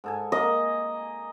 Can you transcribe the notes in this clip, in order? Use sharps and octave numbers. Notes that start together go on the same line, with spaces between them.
G#2 A4 G#5
A#3 D#5